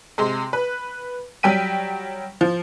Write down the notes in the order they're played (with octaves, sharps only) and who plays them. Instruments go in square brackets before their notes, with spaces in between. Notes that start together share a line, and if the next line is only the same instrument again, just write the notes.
[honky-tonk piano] C3 G#3 C6
B4
F#3 G3 G5 B6 D#7
F3